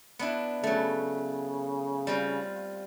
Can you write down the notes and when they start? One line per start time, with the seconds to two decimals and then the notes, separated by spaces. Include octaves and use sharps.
0.19 B3 D4 E4
0.64 C#3 F#3 A3
2.07 G3 C4 F4